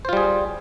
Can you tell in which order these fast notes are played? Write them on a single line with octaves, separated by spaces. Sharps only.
C5 F4 G3 G#4